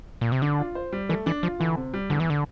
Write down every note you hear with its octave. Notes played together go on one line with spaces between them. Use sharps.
A#2
C3
D3 D4
F4
C5
G3
E3 A3
E3 D4
F3 F4
D3 E3
C3
G3
E2 D3
E3
D3